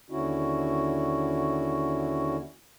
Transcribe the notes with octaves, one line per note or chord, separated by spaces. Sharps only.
D#2 D3 C#4 E4 F#4